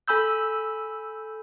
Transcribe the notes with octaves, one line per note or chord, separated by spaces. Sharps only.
A4 G#5 B5 E6 G6